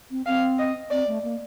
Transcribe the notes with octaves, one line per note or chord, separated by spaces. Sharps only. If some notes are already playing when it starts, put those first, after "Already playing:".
C4
C4 F5
D#5
C4 D5
A3
A#3